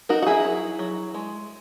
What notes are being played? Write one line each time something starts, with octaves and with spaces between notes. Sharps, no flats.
D#4 F#4 A#4
F#4
E4 G#4
F#3
F#3
G#3